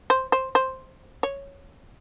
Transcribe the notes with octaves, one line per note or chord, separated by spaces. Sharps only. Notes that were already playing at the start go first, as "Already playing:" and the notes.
C5
C5
C5
C#5